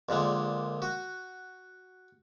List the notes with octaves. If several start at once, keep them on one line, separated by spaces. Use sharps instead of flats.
A#1 A#2 D3 G#3
F#4